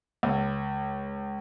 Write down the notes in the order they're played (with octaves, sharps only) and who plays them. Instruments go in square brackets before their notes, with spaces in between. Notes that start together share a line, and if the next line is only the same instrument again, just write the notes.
[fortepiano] C#2